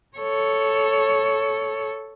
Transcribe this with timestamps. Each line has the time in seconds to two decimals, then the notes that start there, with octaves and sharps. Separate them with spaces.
0.17 A4 C#5